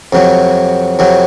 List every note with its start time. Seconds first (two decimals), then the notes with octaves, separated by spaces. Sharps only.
0.13 F2 C3 F#3
0.99 F2 C3 F#3